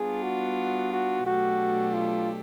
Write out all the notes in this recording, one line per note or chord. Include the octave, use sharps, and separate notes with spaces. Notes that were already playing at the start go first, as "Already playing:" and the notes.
Already playing: G3 B3 D4 F4 G#4
F#4
F#4
B2 F#3 A3 D4 F#4 G4
F4